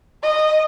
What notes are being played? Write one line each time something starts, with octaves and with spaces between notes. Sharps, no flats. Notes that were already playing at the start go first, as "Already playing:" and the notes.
D#5